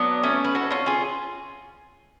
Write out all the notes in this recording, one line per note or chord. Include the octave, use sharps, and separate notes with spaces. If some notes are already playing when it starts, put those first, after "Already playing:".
Already playing: F#3 B3 D4
A3 C#4
B4
F#4 A4
C#4 F4
F4 G#4